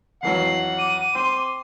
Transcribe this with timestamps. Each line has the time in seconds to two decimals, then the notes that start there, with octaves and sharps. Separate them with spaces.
0.23 F2 E3 F#3 F#5 C7
0.78 D6 D#7
1.15 C4 C6